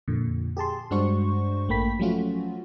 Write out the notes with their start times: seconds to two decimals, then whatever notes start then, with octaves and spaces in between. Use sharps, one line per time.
0.08 F2 A#2 D3
0.57 G4 G#4 A5 C6
0.91 G2 G#3 D4 F#4 C5 C#6
1.68 A1 A3 A#3 G5 B5 B6
1.99 F3 F#3 A3 C#4 F4 F#4